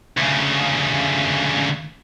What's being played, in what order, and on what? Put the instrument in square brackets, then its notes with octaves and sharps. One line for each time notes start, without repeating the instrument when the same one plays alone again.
[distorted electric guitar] D2 C#3